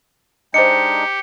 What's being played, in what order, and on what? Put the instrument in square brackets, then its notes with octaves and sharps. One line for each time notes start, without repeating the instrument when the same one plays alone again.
[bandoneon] G#3 D4 D#4 [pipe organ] G4 [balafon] C5 D#5 [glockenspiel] C#7